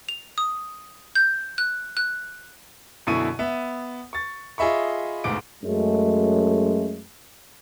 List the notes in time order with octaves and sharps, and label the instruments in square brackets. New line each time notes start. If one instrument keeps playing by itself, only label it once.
[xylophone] F7
D#6
G6
F#6
F#6
[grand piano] F#2 B2 D3 E4 C#6 D#7
B3 E5
C#6 A6
F4 G#4 D#5 E5 B5 C#6
G1 D2 G#2 D6 D7
[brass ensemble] F#2 G#3 A3